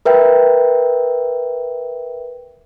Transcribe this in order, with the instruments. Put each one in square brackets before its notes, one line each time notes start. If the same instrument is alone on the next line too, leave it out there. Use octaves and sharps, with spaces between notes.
[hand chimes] A#4 B4 E5 G5